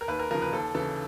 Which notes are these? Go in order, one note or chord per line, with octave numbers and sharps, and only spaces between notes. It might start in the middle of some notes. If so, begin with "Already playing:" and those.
A#4
D#2 B4
A#4
C#3 F3 A#4
B4
D#2 A4
C#3 E3 A4